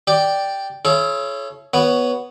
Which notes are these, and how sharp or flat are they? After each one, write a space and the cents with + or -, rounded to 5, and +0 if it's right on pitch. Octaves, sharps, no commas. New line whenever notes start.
G4 +0 D5 +0
E4 +40 A4 -45 C#5 +0
B3 +0 F#4 +0 C#5 +10